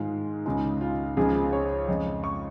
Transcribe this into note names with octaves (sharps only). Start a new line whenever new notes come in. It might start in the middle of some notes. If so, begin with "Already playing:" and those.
Already playing: G#2 D#3 G#3 F4
C#2 C#3 G#3 D#4
F4
C#2 C#3 F3 G#4
C#5
F2 C#3 G#3 D#5
C#6